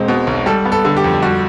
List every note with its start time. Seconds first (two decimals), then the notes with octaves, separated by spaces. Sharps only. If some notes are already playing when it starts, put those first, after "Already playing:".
Already playing: E1 G#3 C4
0.08 B2
0.27 B1
0.46 G3 A4
0.66 B3
0.72 A4
0.85 D3
0.97 G4
1.04 F2
1.22 G3 F#4